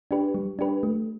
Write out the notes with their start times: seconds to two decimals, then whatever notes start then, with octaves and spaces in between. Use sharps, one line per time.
0.11 D4 G4 B4
0.35 G3
0.59 D4 G4 B4
0.83 A3